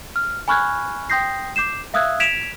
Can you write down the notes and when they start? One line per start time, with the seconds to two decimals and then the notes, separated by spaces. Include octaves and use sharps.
0.16 F6
0.48 G#5 B5 C#6 F6 F#6 G#6
1.10 G5 C6 D#6 G6 A#6 C7
1.56 D6 G6 C7 E7
1.94 E5 F5 D#6 E6 F#6 G#6
2.20 G#6 B6 D7 E7 F7